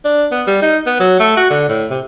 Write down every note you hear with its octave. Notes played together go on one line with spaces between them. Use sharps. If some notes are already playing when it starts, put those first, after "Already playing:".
D4
B3
G3
D#4
B3
F#3
A3
F#4
D3
A2
C3